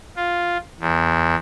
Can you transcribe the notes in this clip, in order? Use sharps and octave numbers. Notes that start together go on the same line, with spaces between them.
F4
E2